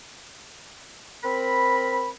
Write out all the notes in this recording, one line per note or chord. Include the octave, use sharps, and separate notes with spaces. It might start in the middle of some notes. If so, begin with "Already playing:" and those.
C4 A#4 B5